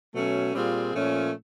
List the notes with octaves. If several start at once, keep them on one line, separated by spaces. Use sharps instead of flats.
B2 F#3 A3 C#4
A#2 G3 C4 F4 G#4
A#2 F3 A3 C#4